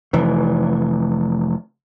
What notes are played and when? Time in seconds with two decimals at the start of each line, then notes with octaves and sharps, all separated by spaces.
0.13 F1 E3